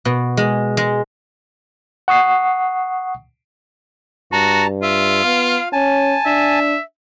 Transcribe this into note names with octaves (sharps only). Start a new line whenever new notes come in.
B2
G#3
G#3
F#5 C#6 D#6 C7
G2 F#4 A5 A#5
F4 E5
B3 F5
C#4 G#5 A5
D4 E5